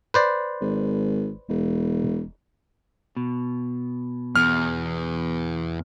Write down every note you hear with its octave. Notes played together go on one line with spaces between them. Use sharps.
B4 C5 D5
G#1
E1
B2
E2 F6